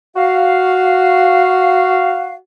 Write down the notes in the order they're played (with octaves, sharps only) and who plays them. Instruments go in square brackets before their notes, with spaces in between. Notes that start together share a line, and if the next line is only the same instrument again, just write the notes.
[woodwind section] F#4 F5